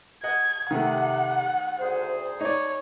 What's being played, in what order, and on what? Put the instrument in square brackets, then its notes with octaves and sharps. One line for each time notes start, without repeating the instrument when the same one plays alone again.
[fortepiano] D#5 F#5 [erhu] G#6
[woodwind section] C3 [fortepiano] D#3 A3 [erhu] F#5
[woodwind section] D2 G#4 C5
[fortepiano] D#4 D5 [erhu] C#5